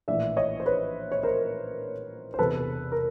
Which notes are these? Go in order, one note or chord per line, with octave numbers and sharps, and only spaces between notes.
A#1 A2 E3 D5 E5
C#5 D#5
C5
B4 C#5
C#5
A#4 C5
C5
E1 E2 C3 A4 B4
A#4